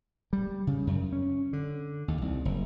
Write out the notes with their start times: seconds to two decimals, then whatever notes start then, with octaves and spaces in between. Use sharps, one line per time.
0.33 G3
0.67 C#3
0.87 F#2
1.13 C#4
1.53 D3
2.08 D#2
2.22 C2
2.45 F#1